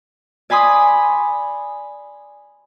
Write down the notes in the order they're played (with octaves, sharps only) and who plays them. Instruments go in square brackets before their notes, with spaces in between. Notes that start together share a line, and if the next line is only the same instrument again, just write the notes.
[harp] D5 G#5 B5 C6 D#6